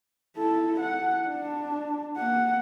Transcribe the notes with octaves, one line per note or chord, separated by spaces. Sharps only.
E4 A4
F#5
D4
A#3 F#5